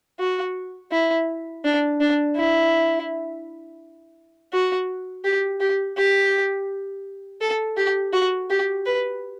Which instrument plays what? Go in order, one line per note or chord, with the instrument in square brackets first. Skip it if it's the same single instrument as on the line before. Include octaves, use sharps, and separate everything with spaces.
[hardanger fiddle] F#4
E4
D4
D4
E4
F#4
G4
G4
G4
A4
G4
F#4
G4
B4